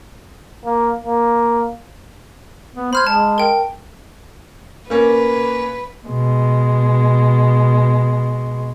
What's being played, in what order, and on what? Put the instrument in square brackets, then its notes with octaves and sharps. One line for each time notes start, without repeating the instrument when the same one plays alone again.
[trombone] A#3
A#3
[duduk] B3
[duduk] C5 [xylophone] B5 F6 G#6
[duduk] G#3 [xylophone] A5
[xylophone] A#4 G5
[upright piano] A#3 C#4 [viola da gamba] B4
[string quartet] B2 G#3